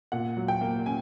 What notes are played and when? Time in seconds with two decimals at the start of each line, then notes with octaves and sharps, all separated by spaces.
0.12 A#2 F#5
0.37 F#3
0.48 G5
0.61 A#3
0.86 C#4 G#5